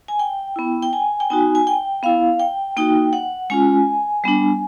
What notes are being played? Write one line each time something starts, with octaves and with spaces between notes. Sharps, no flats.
G#5
G5
B3 E4
G5
G#5
G5
B3 D#4 F#4 G#5
G#5
G5
B3 E4 F5
G5
A#3 D#4 F#4 G5
F#5
G#3 C#4 F4 G#5
G3 B3 D4